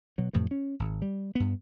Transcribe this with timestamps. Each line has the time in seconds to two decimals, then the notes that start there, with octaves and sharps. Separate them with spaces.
0.18 B2 F#3
0.33 F2 A2 C3 E3
0.51 C#4
0.79 G#1
1.02 G3
1.35 G2 B3